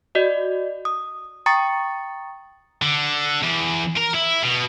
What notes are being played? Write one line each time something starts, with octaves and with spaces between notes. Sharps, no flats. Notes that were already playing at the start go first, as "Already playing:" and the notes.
F#4 D5 D#5
D#6
G5 A#5 C#6 D#6 A6 C#7
D3
E2
A#4
E4
B2